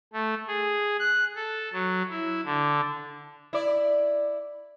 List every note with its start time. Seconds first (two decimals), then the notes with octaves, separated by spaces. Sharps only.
0.13 A3
0.48 G#4
1.00 F#6
1.35 A4
1.73 F#3
2.10 E4
2.45 D3
3.53 E4 D5